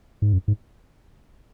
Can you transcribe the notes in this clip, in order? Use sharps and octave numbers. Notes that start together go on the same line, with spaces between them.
G#2
F#2
G#2